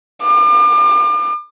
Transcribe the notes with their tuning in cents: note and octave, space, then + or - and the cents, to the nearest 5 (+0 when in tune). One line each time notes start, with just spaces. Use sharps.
D6 +40